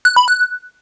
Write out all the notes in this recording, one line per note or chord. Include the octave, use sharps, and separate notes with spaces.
F#6
B5
F#6